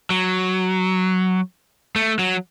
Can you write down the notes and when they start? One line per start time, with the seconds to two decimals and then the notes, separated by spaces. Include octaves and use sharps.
0.10 F#3
1.96 A3
2.19 F#3